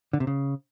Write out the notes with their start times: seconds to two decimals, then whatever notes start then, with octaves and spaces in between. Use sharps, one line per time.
0.13 D3
0.20 C3
0.27 C#3